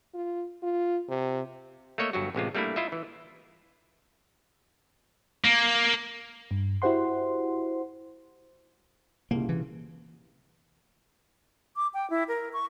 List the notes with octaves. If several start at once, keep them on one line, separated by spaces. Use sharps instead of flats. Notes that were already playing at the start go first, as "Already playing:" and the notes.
F4
F4
C3
A3 A#3 C#5 D#5 E5
G1 G2 F#3 F#4
A1 C3 G#3 F4
G3 A3 A#3 D4 E4
E4 F4 D#5 E5
E3
A#3
G2
E4 F#4 G4 C5 F#5 C6
C2 A#2 C#3 A#3
E3
D6
G5
E4
A#4
C#6